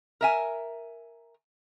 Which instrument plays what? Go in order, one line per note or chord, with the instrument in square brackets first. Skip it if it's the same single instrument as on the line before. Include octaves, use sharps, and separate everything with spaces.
[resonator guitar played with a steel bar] A#4 E5 G#5